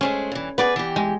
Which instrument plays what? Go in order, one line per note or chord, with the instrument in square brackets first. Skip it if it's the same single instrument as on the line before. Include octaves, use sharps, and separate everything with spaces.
[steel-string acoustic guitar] G#3 A3 C5 [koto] C#4
[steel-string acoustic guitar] G2 E3
[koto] B3 D5 [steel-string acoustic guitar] G#4 B4
[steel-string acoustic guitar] E3 G4
[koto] G#3